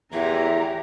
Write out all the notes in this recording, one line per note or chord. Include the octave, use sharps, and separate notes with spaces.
E2 A2 C3 E3 G4 E5 A#5